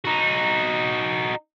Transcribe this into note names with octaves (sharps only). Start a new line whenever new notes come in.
D#4 F#4